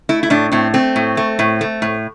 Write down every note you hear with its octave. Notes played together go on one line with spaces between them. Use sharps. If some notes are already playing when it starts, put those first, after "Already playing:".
A3 E4
E4
A2 D4
A2 C4
A3 C4
A2
A3
A2
A3
A2